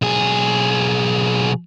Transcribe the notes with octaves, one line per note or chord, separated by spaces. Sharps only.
B1 G#4